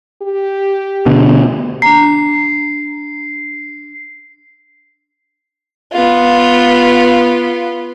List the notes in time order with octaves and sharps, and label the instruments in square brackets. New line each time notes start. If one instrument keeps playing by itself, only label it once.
[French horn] G4
[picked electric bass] B2 D3
[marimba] D4 A#5 [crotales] C7
[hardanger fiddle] B3 F4